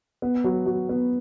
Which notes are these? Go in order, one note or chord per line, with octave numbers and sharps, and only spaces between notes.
B3
F#3
F#3
B3